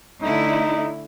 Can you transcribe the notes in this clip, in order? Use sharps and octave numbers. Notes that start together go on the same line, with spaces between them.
D3 A3 D#4 E4